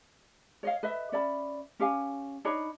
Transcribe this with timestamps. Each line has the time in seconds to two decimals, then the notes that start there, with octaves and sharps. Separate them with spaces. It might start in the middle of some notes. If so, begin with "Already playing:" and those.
0.63 C#5 D#5 F5
0.83 B4 D#5 E5
1.12 C#4 D5 E5 B5
1.79 C#4 G4 F5 G#5
2.45 D4 D#4 C#5 B5